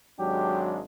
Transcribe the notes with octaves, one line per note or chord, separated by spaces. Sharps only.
G#1 F#3 G#3 D4 G4